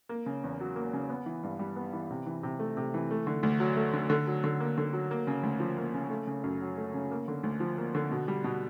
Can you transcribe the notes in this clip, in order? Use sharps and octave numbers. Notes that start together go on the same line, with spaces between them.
A#3
C#3
E2
F#3
A#3
C#3
B3
E3
G2
G3
B3
E3
C3
E3
C3
A3
C3
E3
A3
D3
D2
F#3
A3
D3
D3
F#3
D3
A#3
D3
F#3
A#3
C#3
D2
F3
A#3
C#3
A3
C#3
F#2
F#3
A3
C#3
A#3
D3
D2
F3
A#3
D3
B2
G3
B2